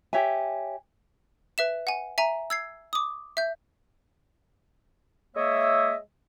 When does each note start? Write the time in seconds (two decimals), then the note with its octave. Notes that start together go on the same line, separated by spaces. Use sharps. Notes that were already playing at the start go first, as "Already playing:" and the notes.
0.13 G4 C#5 E5 G#5
1.58 B4 E5 E7
1.87 F#5 G#5
2.18 E5 G#5 A#5
2.50 E6 G#6 C7
2.93 D6 D#6
3.37 E5 G6
5.36 G#3 A#3 C#5 D#5 E5